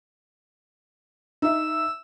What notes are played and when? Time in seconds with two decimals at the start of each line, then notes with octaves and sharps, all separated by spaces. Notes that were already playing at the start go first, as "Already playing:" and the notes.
1.42 D#4 E5 E6